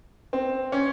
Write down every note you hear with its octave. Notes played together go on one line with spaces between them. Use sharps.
C4
C#4